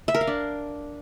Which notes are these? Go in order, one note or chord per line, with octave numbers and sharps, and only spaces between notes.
E5
A#4
F5
D4